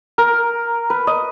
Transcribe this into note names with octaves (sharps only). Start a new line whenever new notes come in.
A#4
B4
D#5